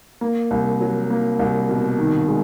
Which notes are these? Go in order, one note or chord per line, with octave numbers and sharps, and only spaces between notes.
A#3
C2
F#3
A#3
C2
B2
D#3
G#3